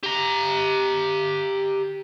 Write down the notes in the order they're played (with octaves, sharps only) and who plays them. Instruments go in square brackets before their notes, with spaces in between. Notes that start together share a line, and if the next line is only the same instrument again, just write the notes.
[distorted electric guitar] G4 A#5